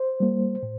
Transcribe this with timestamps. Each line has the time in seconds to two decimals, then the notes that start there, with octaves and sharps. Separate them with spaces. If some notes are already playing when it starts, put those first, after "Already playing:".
Already playing: C5
0.20 G3 A#3
0.63 A2